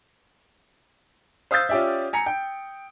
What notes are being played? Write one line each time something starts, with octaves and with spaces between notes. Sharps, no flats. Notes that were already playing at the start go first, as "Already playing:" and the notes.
C5 F5 D#6 E6 G6 A6
C#4 F4 G4 D5 E5
G#5 A#5 C#7
G5